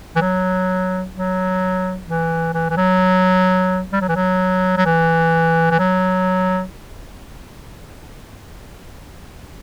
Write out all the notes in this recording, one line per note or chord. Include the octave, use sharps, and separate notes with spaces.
E3
F#3
F#3
E3
E3
E3
F#3
G3
F#3
E3
F#3
F#3
E3
E3
F#3